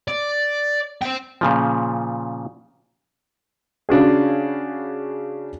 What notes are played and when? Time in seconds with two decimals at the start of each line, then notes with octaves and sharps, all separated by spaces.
0.08 D5
1.01 C5 G5
1.41 A#2 C#3 F3
3.89 C#3 D4 F#4 G#4